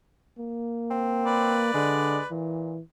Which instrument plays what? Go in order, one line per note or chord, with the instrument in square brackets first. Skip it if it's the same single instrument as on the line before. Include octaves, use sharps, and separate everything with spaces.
[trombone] A#3
[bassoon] C4
[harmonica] B4 D5
[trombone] D3 [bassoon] G#3
[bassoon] A#2 [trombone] E3